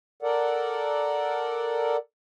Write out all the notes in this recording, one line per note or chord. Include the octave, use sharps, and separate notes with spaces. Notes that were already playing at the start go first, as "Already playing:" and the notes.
A4 A#4 D5 F#5